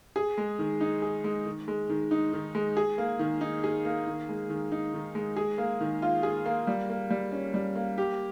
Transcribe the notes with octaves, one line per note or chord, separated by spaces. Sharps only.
G#4
G#3
D#3
D#4
G#4
G#3
D#3
G#3
D#3
D#4
D#3
G#3
G#4
A#3
D#3
D#4
G#4
A#3
D#3
G#3
D#3
D#4
D#3
G#3
G#4
A#3
D#3
F4
G#4
A#3
G3
A#3
G3
C#4
G3
A#3
G4